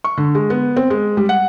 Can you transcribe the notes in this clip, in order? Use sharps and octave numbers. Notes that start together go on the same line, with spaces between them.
C#6
D3
G#3
B3
C4
G#3
G3
F#5